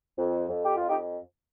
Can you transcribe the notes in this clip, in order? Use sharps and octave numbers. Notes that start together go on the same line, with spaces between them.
F2
F2
G4
F2 F4
D#4 G4